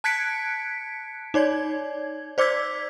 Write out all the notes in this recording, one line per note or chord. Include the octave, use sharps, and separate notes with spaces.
A5 F#6 G#6 B6 C#7 D7
D#4 C#5 D5 G#6
C5 D5 D6 E6 G#6 B6